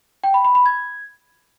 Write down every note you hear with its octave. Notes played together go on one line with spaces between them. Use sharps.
G5
B5
B5
B5
G#6